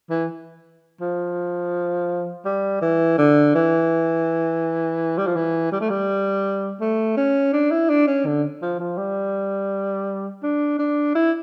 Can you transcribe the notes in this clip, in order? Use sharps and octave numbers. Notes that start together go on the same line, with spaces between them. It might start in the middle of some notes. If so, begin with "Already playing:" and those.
E3
F3
G3
E3
D3
E3
G3
F3
E3
G3
A3
G3
A3
C#4
D4
E4
D4
C#4
D3
F3
F3
G3
D4
D4
E4